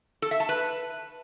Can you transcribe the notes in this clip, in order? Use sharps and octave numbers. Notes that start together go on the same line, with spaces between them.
A4
E5
A5
B4